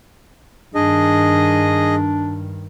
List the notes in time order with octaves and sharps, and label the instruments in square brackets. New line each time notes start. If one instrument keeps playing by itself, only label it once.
[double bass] G2 D#3 [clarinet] D4 [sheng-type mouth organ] G#4 D#5